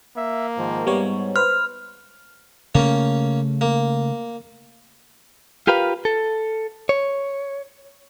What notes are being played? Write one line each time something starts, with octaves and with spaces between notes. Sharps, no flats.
A#3 E5
G#2 D#3 F3
G#2 G3 B3 C#5
B4 C5 F6
C#3 A3 A#3 C#4
A#3
F4 G4 A#4 B4 F5
A4
C#5